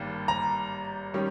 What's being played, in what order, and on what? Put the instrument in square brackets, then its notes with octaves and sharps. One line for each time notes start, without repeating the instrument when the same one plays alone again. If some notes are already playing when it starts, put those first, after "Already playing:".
Already playing: [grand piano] G#1 G2 G3 A#3
[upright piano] A#5
[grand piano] D#3 G3 C#4